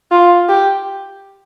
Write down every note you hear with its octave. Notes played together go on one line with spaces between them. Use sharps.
F4
G4